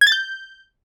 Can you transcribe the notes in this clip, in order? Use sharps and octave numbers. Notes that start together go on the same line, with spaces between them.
G#6
A6
G6